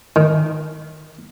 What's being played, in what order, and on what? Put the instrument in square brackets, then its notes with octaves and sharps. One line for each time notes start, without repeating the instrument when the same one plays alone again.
[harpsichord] D#3